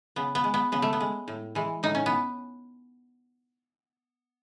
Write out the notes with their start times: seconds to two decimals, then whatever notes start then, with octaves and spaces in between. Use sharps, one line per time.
0.16 C#3 B3
0.35 B3
0.44 G#3
0.54 B3
0.72 C#3 B3
0.82 A3
0.93 B3
1.01 G#3
1.28 A2
1.55 E3 G#3
1.83 A2 D#4
1.95 C#4
2.06 B3